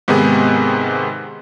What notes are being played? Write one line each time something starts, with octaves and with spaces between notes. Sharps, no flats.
G#2 C3 D#3 B3 G#4